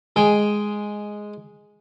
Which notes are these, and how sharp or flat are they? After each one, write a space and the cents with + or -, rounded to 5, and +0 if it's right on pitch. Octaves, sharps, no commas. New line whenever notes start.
G#3 +0 G#4 +0 G5 +0